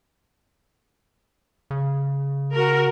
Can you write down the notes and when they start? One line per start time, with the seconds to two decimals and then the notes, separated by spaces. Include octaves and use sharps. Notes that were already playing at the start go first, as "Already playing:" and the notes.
1.71 C#3
2.54 F#4 A#4